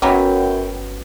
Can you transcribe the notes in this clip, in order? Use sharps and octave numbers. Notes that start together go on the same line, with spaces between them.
G1 F#2 F#3 B3 C#4 G5